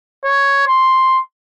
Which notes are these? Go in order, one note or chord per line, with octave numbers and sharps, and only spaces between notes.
C#5
C6